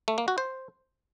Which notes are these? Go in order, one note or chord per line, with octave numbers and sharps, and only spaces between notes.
A3
A#3
F#4
C5